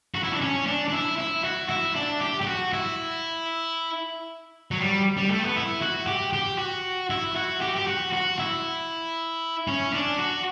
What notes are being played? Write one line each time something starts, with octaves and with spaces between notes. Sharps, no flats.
F#4
E4
D4
C#4
D4
D4
E4
E4
F#4
E4
D4
G4
G4
F#4
E4
F#3
G3
G3
A3
B3
E4
F#4
G4
G4
F#4
E4
F#4
G4
G4
F#4
F#4
E4
C#4
D4
F#4